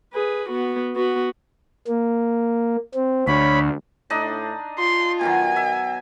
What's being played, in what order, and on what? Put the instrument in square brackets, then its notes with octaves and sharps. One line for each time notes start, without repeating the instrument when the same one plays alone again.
[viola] G#4 B4
B3 F#4
B3 F#4
[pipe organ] A#3
C4
[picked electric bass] D2 [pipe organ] C#5 B5
[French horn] A2 [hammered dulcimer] D4 D#4 D#5
[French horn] F4 [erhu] C6
[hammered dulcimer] B2 D#3 F#3 [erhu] G#5
[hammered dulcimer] E5